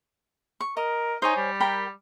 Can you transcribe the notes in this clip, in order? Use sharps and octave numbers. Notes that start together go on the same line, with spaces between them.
C#6
A#4 D#5
D#4 C5 C#5 G#5
G3
A#4 G5 B5